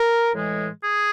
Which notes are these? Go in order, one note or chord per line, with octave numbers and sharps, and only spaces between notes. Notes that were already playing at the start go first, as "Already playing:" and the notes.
Already playing: A#4
A2 E3 G#3
G#4